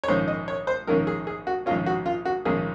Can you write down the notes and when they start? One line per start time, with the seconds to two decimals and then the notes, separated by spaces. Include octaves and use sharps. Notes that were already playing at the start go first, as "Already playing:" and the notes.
0.04 C#5
0.08 A#1 G#2 D#3 A#3 C#4 C5
0.28 D#5
0.48 C#5
0.67 C5
0.87 A#1 G#2 D#3 A#3 C#4 A#4
1.07 G#4
1.27 G#4
1.47 F#4
1.66 A#1 G#2 D#3 A#3 C#4 F4
1.86 F#4
2.06 F4
2.25 F#4
2.45 A#1 G#2 D#3 A#3 C#4 G#4